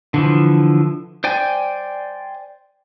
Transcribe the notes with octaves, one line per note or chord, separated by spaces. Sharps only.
D3 E3 F3
C5 D5 G5 G#5